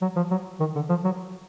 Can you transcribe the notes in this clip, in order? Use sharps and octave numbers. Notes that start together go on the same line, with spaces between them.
F#3
F3
F#3
D#3
D3
F3
F#3